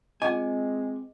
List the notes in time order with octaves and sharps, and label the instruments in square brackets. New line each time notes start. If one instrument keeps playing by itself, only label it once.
[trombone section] G#3 C4 [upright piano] F4 D6 [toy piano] D#5 [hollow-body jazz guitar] F#5 G#5